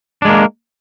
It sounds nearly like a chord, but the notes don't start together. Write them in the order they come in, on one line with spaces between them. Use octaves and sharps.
D4 G#3 A#3